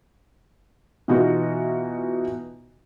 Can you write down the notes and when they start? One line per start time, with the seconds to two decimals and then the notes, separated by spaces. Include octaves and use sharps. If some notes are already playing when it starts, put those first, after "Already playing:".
1.08 B2 E3 D#4 F4 F#4